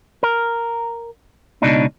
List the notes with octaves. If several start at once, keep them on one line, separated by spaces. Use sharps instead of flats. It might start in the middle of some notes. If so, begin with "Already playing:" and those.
A#4
C#2 B2 D4 D#4